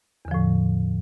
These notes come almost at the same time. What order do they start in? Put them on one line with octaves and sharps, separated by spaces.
E2 D3 F3 A2